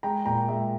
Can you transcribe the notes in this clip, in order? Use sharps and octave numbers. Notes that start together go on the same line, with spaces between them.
G#3 G5 A#5
A#2 G5 A#5
G#3 E5 G5